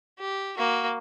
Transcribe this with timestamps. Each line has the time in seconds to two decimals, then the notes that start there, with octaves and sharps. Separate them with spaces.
0.20 G4
0.57 A#3 F#4